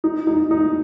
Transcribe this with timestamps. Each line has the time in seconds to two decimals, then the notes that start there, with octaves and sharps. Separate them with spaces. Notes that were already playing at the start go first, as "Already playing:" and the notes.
0.04 D#4
0.27 D#4
0.51 D#4